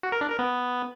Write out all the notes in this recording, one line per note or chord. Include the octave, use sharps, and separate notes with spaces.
F#4
A#4
D4
A#4
B3